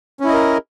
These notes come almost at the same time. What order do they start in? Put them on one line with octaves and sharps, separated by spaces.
C#4 E4 D#5 A#4